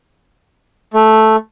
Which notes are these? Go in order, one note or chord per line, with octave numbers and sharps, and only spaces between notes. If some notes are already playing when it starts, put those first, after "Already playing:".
A3